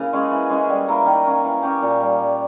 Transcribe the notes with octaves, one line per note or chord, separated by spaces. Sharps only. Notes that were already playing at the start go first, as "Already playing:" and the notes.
Already playing: C#3 A#3 E4
G#3 C#4 G#4
E3
G#3 C#4 E4
G3
A#3 E4 A#4
D#3
A#3 C#4
E3
A#3 C#4 G4
A#2
G3 A#3
G3